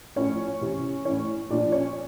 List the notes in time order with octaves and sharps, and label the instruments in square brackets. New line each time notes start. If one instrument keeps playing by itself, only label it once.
[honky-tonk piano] A2 F3 C#4 C#5
C3 E3
A2 E3 C#4 C#5
A#2 F3 D4 D5
C#4 C#5